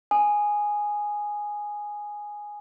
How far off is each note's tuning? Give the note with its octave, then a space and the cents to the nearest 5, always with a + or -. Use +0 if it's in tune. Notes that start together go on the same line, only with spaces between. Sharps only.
G#5 +0 D#6 -20